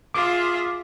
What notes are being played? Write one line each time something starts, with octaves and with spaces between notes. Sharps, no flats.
F4 G#4 E5 D6